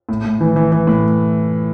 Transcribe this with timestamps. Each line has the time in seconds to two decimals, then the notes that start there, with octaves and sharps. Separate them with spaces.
0.09 A2
0.24 A2
0.41 E3
0.56 E3
0.72 E3
0.87 A2